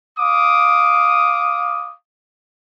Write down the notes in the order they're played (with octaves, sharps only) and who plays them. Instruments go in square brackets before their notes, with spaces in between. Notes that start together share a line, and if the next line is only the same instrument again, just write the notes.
[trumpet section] F5 D6 D#6